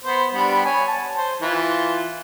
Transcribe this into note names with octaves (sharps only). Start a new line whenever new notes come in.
B3 C5
G3 B3 D4
C#5 G#5
A5
C5
E3 F4